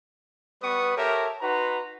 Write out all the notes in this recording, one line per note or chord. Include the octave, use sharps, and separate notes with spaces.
G3 B3 B4 C#6 D#6
G4 A4 A#4 C#5 E5
D#4 F#4 B4 A#5 C6